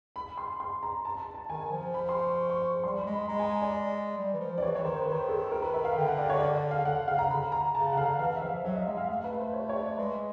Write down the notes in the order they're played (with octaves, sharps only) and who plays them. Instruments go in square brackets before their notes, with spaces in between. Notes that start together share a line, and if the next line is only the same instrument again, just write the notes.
[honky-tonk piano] B5
C6
C6
A#5
A5
A5
A5
[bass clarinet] D#3 [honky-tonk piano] G#5
[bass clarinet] F3 [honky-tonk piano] A5
[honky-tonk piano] B5
C6
C#6
C#6
[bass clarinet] G3 [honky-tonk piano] C6
[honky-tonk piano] B5
[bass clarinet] G#3
[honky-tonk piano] B5
[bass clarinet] G#3 [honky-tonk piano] A#5
[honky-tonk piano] G#5
D5
[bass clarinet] G3
E3
F3
[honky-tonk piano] D5
[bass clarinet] E3 [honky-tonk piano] C#5
[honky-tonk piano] C#5
[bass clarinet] D#3 [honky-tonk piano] C5
[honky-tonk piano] B4
[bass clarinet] D#3 [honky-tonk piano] C5
[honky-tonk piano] A4
A#4
B4
E5
F5
[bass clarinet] D3 [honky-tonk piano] G5
[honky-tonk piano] F#5
D5
C#5
D5
F5
[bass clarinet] D3 [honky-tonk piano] F#5
[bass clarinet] C#3 [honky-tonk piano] F5
[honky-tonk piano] A#5
[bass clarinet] D3 [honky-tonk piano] B5
[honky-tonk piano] A#5
[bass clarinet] C#3 [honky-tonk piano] A5
[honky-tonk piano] F#5
[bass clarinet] D3 [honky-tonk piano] F5
[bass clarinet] E3 [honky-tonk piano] F5
[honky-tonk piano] E5
[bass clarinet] F3 [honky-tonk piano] F5
[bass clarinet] F#3 [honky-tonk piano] E5
[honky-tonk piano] D#5
[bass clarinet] G#3 [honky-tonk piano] E5
[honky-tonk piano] F5
[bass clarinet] A3 [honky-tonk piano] F5
[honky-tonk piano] B4
C5
C#5
C#5
D5
[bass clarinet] G#3 [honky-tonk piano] B4